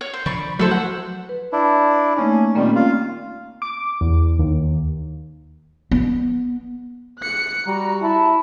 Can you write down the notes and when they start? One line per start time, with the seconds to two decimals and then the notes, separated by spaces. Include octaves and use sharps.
0.01 C#5
0.14 C5
0.26 D3 F3 D5 B5 C#6
0.59 F3 F#3 A3 E4 A4 C5
0.71 F#5
1.29 B4
1.53 D4 E4
2.17 A3 A#3 C#4 D#4
2.55 A#2 D#3 G3 A#3 C4 C#4
2.75 F4
3.62 D6
4.01 E2
4.39 D#2
5.91 B3
7.19 F#6 C#7
7.67 G3 F#4 A#5
8.02 E4 A5